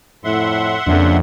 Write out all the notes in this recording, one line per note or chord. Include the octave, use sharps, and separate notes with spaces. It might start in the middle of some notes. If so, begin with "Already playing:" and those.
F2 A2 E5 F#5 C6
F2 C#3 A#3 D4